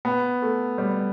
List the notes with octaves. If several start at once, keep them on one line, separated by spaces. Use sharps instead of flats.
B3
A3
G3